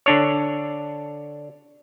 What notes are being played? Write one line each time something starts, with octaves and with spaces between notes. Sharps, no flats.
D3 D4 C#5